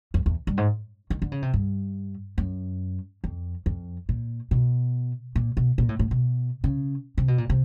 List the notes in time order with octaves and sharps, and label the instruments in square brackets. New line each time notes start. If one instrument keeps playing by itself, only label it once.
[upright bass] F2
E2
G2
G#2
D#3
D3
C#3
C3
G2
F#2
F2
F2
A#2
B2
A#2
B2
A#2
A2
A2
B2
C#3
C3
B2
A#2
C3